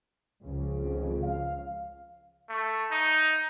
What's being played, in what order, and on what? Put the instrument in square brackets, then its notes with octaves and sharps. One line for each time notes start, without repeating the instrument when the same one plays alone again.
[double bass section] C#2 C#3 F3
[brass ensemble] G#1 F2
F5
[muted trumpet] A3
D#4